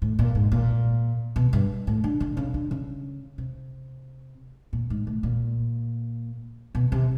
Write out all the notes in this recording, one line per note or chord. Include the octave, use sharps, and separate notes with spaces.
A2
A#2
G#2
A#2
B2
G2
A2
D3
D3
C#3
D3
C#3
C3
A#2
G#2
A2
A#2
B2
C3